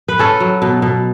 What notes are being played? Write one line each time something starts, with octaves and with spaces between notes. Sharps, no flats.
B4
C#4 A4
F#3
B2
B2